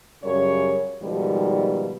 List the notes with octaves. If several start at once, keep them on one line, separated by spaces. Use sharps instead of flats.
F#2 C#3 G3 A#4 C#5
G#2 B2 D#3 F3 G3